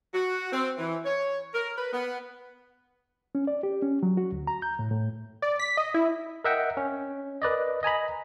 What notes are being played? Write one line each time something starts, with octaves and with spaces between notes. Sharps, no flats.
F#4
C4
E3
C#5
A#4
B4
B3
C#4
D5
G4
C#4
F#3
F#4
D2
A#5
G6
A2
A2
D5
B6
D#5
E4
A#4 D#5 E5 F#5 G5
C#4
A#4 B4 D5 D#5
D#5 G#5 A#5 B5